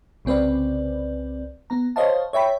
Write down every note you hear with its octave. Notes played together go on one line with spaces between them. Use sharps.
C2 C#3 C4 B4 D5
B3 A#5
C5 C#5 D#5 F5 A5
C#5 E5 G5 B5